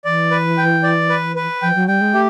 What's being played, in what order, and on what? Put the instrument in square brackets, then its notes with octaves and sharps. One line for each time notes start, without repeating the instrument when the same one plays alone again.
[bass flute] E3 [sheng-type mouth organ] D5
[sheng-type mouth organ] B4
G5
D5
B4
B4
[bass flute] F3 [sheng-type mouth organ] G5
[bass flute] F#3
[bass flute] G3 [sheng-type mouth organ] G5
[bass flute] G#3
[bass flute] A3 [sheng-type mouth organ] G4